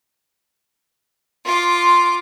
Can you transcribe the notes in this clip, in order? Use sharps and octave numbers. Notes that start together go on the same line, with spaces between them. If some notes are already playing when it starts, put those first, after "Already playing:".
F4 C6 D6